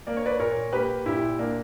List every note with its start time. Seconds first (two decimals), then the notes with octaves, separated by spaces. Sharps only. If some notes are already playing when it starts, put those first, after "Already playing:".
0.07 A#3 D5
0.17 C#5
0.26 B4 D5
0.40 A#2 A#4 C#5
0.72 A#3 G4 B4
1.06 A#2 E4 G4
1.39 A#3 D4